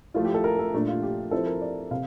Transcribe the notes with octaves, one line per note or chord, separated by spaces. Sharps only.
F3 A3 E4 F4
G4
A4
A#4
A4
A#2 A3 D4
F4
G4
F3 C4 E4 A4
A#4
D5
C3 F5